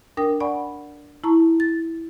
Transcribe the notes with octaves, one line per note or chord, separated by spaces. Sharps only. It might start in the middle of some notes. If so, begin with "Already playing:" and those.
D4 A#4 G5 D#6
D5 F#5 G#5 B5 C#6
E4 A5 A#5 C#6
A6